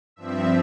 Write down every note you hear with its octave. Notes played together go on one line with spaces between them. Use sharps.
G2 F3 C4 E5